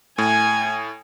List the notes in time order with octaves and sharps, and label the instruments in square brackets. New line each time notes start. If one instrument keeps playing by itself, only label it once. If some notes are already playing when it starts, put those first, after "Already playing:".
[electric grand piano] A2 [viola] G#5